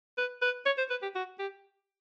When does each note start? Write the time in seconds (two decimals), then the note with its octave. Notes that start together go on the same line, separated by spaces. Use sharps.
0.18 B4
0.42 B4
0.66 C#5
0.78 C5
0.90 B4
1.02 G4
1.15 F#4
1.39 G4